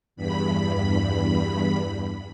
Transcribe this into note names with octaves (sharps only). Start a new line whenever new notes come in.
E2 G2 B5